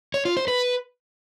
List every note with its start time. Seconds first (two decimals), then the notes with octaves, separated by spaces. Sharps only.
0.14 C#5
0.25 F4
0.37 C5
0.48 B4